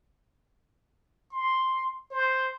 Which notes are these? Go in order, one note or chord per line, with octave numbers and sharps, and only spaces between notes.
C6
C5